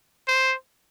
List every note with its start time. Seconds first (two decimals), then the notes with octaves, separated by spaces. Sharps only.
0.28 C5